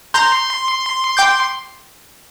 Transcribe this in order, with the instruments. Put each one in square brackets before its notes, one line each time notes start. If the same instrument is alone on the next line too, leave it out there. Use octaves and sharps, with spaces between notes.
[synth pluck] A#5 G6 [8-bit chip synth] C6
[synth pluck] G5 D6 G6